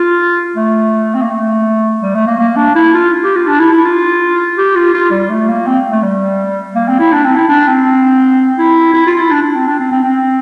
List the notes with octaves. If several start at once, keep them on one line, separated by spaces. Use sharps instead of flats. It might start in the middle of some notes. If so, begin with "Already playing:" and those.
Already playing: F4
A3
C4
A#3
A3
G3
A3
A#3
A#3
D4
E4
F4
G4
F4
D4
E4
E4
F4
G4
F4
F4
G3
A3
A#3
C4
A3
G3
A#3
C4
E4
D4
C4
E4
D4
C4
E4
E4
F4
E4
D4
D4
C4
D4
C4
C4
C4